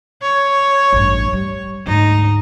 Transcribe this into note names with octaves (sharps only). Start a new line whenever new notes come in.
C#5
A1 G2
G3
D2 G#2 D#4